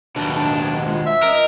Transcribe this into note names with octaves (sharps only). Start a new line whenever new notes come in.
D#2 B2 D4
G#3 D4
C5 F#5 G#6
G#3 F4
E5
C#4 A#4 D#5